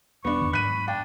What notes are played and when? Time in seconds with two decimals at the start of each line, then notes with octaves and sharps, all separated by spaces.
0.24 E1 G3 B3 D4 C#6
0.41 E2 G2 D#3
0.53 G#2 F#3 B5 F#6 D#7
0.88 D4 G5